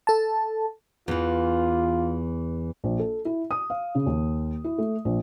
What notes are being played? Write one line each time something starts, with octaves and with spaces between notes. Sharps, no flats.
A4 A5
E2 E3 F4
A#1
A4
E4
D#6
F5
C#3
D#2
E4
A3
A#1